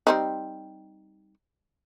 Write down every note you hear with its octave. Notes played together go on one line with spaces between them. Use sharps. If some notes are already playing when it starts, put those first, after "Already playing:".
G3 C4 D#4